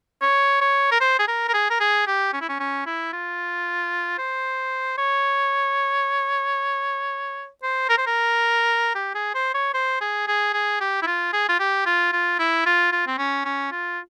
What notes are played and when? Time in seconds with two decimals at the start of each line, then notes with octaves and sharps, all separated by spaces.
0.22 C#5
0.61 C#5
0.91 A#4
1.00 C5
1.19 G#4
1.28 A#4
1.48 A#4
1.54 G#4
1.70 A#4
1.80 G#4
2.07 G4
2.33 C#4
2.41 E4
2.49 C#4
2.60 C#4
2.86 E4
3.13 F4
4.18 C5
4.98 C#5
7.63 C5
7.89 A#4
7.98 C5
8.06 A#4
8.95 G4
9.15 G#4
9.35 C5
9.54 C#5
9.74 C5
10.01 G#4
10.27 G#4
10.53 G#4
10.80 G4
11.02 E4
11.07 F4
11.33 G#4
11.49 F4
11.59 G4
11.86 F4
12.12 F4
12.39 E4
12.66 F4
12.92 F4
13.07 C4
13.18 C#4
13.45 C#4
13.72 F4